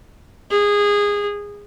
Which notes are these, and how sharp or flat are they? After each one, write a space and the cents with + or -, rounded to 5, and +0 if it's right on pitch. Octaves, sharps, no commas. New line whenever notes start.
G#4 -20